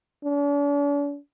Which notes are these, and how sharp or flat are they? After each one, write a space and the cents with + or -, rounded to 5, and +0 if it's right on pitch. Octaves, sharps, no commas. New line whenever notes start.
D4 -45